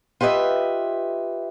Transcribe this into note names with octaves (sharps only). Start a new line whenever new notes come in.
F4 G4 B4 D#5 E5